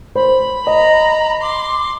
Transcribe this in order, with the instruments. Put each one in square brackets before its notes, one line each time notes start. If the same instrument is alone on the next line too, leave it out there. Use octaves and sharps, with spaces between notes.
[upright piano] C5 [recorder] B5
[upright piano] D#5 [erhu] A#5
[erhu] C6 [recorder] D6